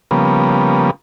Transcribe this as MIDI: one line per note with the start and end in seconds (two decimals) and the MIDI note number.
0.11 0.91 49
0.11 0.91 53
0.11 0.91 55
0.11 0.91 58
0.11 0.91 59